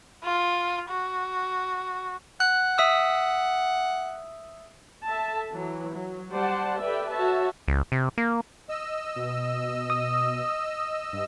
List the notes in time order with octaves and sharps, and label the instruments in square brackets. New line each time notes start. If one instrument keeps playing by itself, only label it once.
[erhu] F4
F#4
[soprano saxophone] F#5 [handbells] F#6
[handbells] E5 D#6 E6
[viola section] A4 E5 A5
E3 F#3
F#3
G3 C5 D5 F#5 A5
G4 A4 B4 D5 E5 G5
F#4 C#5 E5 A5
[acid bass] C#2
C3
A#3
[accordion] D#5 E6
[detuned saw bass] B2
[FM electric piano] D#6
[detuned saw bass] G2